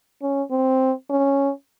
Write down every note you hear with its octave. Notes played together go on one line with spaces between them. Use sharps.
C#4
C4
C#4